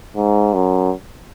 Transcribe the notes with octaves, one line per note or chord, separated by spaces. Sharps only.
G#2
F#2